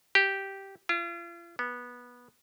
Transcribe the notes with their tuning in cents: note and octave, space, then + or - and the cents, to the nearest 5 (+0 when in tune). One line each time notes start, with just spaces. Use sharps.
G4 -5
F4 -40
B3 -15